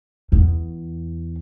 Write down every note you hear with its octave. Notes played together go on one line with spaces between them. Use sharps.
E2